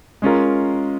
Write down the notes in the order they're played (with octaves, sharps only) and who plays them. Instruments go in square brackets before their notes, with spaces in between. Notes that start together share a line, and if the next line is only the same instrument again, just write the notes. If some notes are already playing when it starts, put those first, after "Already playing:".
[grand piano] G#3 C#4 F4 A#4